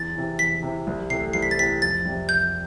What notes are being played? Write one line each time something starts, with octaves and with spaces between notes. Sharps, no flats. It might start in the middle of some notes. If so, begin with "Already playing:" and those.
Already playing: E2 A6
C3 E3
E2 B6
C3 E3
C2
C3 E3 A3 C7
C2 C7
B6
A6
C3 E3 A3 B6
F2 A6
C3 G3
F2 G6